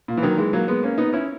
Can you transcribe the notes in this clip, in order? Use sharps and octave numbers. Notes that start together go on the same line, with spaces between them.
A#2
E3
D#3 F#3
E3 G#3
F#3 A#3
G#3 B3
A#3 C#4
B3 D#4
C#4 E4